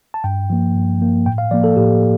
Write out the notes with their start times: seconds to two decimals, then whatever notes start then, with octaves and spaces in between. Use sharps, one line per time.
0.14 A5
0.24 G2 G5
0.50 F3 A#3
0.75 G2
1.00 F3 A#3
1.26 A2 G5
1.38 F5
1.51 F3 A#3 D5
1.64 A4
1.76 A2 G4